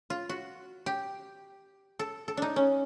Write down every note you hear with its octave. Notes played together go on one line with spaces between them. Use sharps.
F4
F#4
G4
A4
A4
D4 D#4
C#4